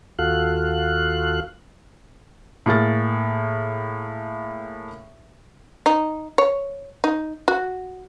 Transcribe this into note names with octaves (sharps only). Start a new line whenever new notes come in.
D#2 F4 F#4 A4 F5 F#6
A2 A#3 G#4 A6
D#4
C#5
D#4
F#4